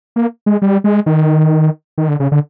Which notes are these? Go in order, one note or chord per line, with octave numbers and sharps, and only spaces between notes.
A#3
G#3
G3
G#3
D#3
D#3
D3
C#3
D3